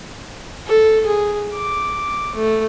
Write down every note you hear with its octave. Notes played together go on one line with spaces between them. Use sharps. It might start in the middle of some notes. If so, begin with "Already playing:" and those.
A4
G#4
D6
A3